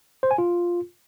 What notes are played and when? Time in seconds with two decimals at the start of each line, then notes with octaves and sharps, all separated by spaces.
0.23 C5
0.31 G#5
0.38 F4